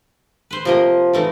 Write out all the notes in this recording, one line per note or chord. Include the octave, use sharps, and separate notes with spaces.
B4 C5
C3 F3 A#3 D#5
E3 A3 D#4